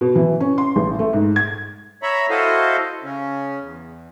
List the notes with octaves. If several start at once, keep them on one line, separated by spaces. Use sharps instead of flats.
B2
E3
C#4
C6
A1
A3
G#2
G#6
C#5 E5 A#5 B5
E4 F#4 A4 C5 D#5 F5
C#3 C#4
E2